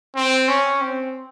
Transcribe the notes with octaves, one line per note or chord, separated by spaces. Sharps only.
C4
C#4
C4